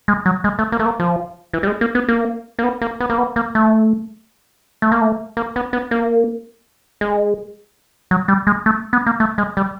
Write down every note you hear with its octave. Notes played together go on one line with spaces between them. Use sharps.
G#3
F#3
G#3
A3
A#3
A3
A#3
F3
E3
G3
G#3
A#3
B3
A#3
A#3
B3
A#3
B3
A#3
B3
A#3
A3
A3
A#3
A3
A#3
B3
B3
A#3
G#3
F#3
G3
G#3
A3
B3
A#3
A3
G#3
G3